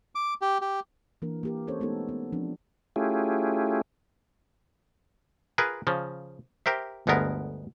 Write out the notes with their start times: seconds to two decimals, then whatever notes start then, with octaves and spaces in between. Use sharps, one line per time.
0.15 D6
0.41 G4
0.61 G4
1.22 E3 A#3 D4 A#4
1.43 A#3 G4 A#4
1.67 C4 C#4 A4 C5 C#5
1.80 G#3 A3 B3 D#4 G4 A4
2.09 B3
2.32 F3 C4 D4
2.96 A3 C#4 E4 F4 G4 G#4
5.58 F4 G#4 A#4 B4
5.87 C#3 F3
6.66 G4 A#4 C5 E5
7.07 G1 D2 G#3 B3 A#4